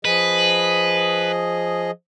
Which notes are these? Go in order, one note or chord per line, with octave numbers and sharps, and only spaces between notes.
F3 G#4 B4 D#5